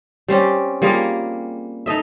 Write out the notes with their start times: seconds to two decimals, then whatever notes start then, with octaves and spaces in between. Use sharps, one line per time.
0.28 G3 C4 C#4 G4
0.82 G3 A#3 F4 G#4
1.86 D#4 A4 D#5 E5